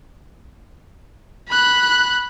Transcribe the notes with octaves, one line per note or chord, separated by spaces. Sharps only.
B5 F#6